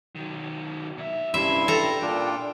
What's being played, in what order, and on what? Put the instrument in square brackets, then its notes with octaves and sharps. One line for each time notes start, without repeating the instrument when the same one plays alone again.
[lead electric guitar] D#3 F#3
A#2 E5
[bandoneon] G2 E4 C6 [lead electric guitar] C3 C#4 [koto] E5
[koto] A4 A#5 [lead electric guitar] G5
[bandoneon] A#2 D4 F4